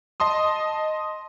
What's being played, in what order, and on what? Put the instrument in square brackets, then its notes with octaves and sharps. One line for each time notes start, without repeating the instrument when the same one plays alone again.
[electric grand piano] D#5 A5 C6 D#6